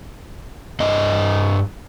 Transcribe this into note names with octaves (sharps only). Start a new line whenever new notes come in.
G2 D#5